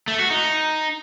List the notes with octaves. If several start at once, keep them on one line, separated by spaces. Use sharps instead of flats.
A3
F#4
D#4